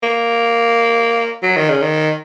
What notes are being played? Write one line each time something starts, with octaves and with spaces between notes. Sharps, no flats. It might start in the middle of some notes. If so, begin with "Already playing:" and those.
A#3
F#3
D#3
C#3
D#3